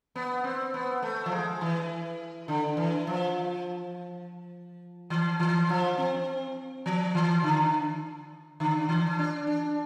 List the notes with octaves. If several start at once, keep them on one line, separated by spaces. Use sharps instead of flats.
B3
C4
B3
A3
F3
G#3
E3
D3
E3
F3
E3
E3
F3
C4
F3
E3
D3
D3
E3
D4
D4